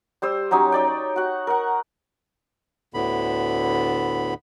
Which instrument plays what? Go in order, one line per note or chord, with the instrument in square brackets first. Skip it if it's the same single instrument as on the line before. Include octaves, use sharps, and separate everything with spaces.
[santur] G3 C5 E6
F#3 C#4 D#4 G4
D#4 D5 G5
C#5
F#4 F#5
A#4 F#5
[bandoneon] D2 A2 D3 B3 B5